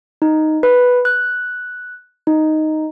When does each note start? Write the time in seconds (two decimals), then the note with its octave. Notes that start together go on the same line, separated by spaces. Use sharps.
0.22 D#4
0.63 B4
1.05 F#6
2.27 D#4